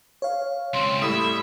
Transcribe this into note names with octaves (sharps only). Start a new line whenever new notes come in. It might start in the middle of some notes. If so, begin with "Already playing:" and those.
C#5 F5
C#2 C4 C6
A2 G3 A3 E5 B5 D#6